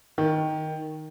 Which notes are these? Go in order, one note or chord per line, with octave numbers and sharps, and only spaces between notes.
D#3